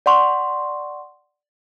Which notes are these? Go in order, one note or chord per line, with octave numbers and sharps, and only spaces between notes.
D5 F#5 C6 C#6